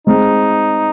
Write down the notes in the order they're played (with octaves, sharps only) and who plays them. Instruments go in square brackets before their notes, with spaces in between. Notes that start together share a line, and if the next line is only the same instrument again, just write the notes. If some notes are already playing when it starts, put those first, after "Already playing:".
[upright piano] G#3 C4 [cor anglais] D#4